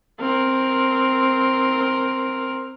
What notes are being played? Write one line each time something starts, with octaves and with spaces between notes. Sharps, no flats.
C4 A#4